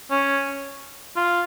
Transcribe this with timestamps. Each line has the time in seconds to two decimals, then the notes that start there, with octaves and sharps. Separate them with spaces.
0.11 C#4
1.16 F4